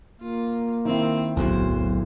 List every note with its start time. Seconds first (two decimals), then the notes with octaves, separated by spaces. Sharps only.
0.21 A#3 F4
0.85 D#3 C4 E4
1.36 D1 B1 E2 F#4 C5